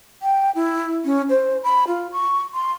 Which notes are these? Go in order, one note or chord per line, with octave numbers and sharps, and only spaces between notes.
G5
E4
C#4
C5
B5
F4
C#6
C6